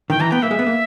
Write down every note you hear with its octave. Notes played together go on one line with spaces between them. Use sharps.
D#3 G5
E3 A#5
B3 G5
A#3 E5
G#3
B3
A#3